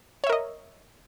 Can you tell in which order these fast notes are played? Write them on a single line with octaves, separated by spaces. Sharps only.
C#5 E5 A#4 D#5